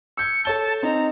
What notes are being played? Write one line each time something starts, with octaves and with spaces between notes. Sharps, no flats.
E6 G6 G#6 C#7
A4 C#5 A5 G7
C4 D#4 A#5